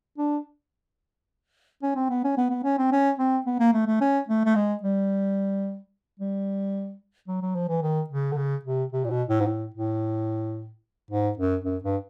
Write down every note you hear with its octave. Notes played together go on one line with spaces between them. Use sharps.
D4
C#4
C4
B3
C#4
B3
B3
C#4
C4
C#4
C4
B3
A#3
A3
A3
C#4
A3
A3
G#3
G3
G3
F#3
F#3
F3
E3
D#3
C#3
D3
C#3
C3
C3
A#2
B2
A2
G#2
A2
A2
G#2
F#2
F#2
G2